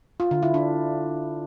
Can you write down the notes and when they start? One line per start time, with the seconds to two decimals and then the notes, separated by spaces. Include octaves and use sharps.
0.20 F4
0.31 D3
0.43 E4
0.54 D4